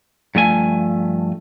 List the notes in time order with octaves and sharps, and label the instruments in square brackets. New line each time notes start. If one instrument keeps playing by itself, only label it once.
[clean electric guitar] G2 F3 A3 G#5